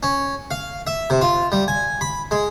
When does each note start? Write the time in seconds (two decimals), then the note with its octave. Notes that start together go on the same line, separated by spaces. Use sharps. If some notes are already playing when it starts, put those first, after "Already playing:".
0.03 C#4
0.51 F5
0.87 E5
1.10 C3
1.21 F4
1.52 G3
1.68 G#5
2.01 B5
2.31 G#3